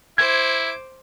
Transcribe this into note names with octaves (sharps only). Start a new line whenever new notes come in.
E4 C5 D6 G#6